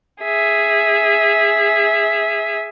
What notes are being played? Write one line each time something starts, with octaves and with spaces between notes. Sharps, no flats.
G#4 E5